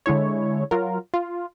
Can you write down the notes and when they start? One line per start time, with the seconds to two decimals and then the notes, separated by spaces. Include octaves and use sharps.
0.06 D3 G#3 E4 C#5
0.71 F#3 F4 A#4
1.14 F4